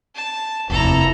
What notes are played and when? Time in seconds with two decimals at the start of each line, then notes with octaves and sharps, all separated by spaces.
0.15 A5
0.70 F1 D#2 E4 A4 A#5